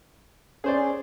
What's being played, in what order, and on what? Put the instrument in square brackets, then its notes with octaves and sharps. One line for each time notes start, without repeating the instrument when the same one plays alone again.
[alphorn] C#4 [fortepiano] G#4 C5 D5